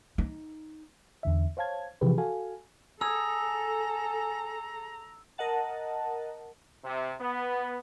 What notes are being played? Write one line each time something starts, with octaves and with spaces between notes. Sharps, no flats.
D#4
E2 D3 E5
C5 C#5 F5 A5 G#6
C3 E3 F3 G4 G#4 B4
F#4 A4 F5 G#5
G#4 A4 A#5 E6
A#4 D#5 F#5 A5
C3
B3